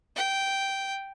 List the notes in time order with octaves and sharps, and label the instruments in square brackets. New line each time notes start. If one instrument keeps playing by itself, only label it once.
[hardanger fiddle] G5